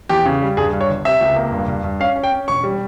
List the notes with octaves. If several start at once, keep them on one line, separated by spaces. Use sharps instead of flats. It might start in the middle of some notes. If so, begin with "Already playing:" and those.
E2 G4
C#3
G3
G2 G#4
G2
C#5
G1
C3 E5
C#2
A#3
G2
G2
G2
C#4 F5
C#4
G5
C#4
E1 C#6
G3